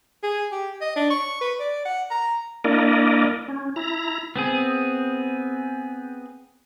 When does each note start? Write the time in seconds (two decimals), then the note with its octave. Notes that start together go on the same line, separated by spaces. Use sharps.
0.23 G#4
0.52 G4
0.81 D#5
0.96 D4
1.10 C#6
1.41 B4
1.59 D5
1.85 F#5
2.11 A#5
2.64 A#3 D4 E4 A#4 D5 D#5
3.48 C#4
3.76 E4 A#5
4.36 B3 C4 G#4